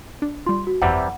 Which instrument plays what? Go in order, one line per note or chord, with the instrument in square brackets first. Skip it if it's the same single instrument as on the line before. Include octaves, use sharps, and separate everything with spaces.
[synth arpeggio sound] D4
[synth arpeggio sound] G3 F4 [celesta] C6
[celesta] F#4
[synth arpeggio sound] G1 F2 [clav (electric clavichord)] C3 E3 G3 [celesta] F#5